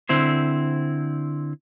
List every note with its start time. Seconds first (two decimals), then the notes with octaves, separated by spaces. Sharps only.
0.09 D3 C4 E4 C5